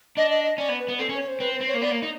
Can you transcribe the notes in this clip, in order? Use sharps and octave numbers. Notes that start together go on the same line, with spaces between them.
D4 D#5
D#5
D#5
C#4 D5
B3
B4
B3
C4 A4
C#4
C#5
C5
C4 B4
C5
C4
C#5
A#3
B3 D5
A#3
D#4